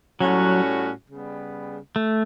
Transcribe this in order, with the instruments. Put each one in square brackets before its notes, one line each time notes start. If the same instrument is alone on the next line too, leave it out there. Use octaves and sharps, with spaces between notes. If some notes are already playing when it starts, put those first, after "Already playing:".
[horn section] A2 G3 C#4 F#4 [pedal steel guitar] F#3
[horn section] C#3 G3 B3
[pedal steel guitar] A3